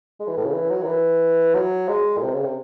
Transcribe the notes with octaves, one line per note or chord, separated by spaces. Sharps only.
G#3
E3
A2
C#3
E3
F#3
D#3
E3
F#3
G#3
A2
C3
C#3
C3